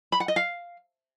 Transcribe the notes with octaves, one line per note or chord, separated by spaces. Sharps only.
B5
F#5
D#5
F5